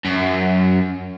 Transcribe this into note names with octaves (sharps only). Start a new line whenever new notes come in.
F#2